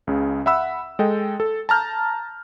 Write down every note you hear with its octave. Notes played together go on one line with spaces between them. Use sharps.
C#2 C#3
E5 F#5 B5 E6
G#3 A4 D#5 G5
A4
A5 A#5 F6 G6